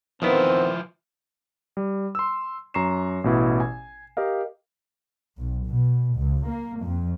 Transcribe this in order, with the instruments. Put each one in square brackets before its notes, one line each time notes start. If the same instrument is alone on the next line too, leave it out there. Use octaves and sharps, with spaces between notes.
[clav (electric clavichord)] E2 D#3 B3 [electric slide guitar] F3 E4 [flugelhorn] C4
[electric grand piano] G3
C6 E6
F#2 A#5 C#6 C7 E7
A1 B2 E4
G#5
G4 A#4 D#5 F5
[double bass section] B1
B2
C#2
A#3
F2